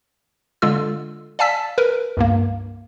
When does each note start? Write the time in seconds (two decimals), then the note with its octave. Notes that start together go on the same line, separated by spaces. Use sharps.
0.62 D3 G#3 F4 E6
1.39 D5 F5 G#5 A5 E6 B6
1.78 A#4 B4
2.17 C#2 G2 A#3